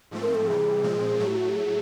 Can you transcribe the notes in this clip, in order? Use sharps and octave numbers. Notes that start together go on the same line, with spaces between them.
G#2 F3 A3 C4
A#4
A4
C3 E3 G3 G#4
A#2 F3 G#3 C4
A2 F#3 A3
G4
F#4
G4
G#4